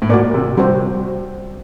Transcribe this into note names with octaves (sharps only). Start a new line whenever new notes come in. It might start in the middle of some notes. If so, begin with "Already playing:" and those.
A2
A#2 F#4 A#4 D5
C3
C3 G3 C4 F#4 C5